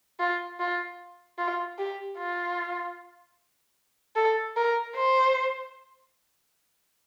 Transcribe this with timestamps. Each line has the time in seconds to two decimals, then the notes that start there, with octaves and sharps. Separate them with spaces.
0.20 F4
0.60 F4
1.38 F4
1.78 G4
2.18 F4
4.16 A4
4.56 A#4
4.96 C5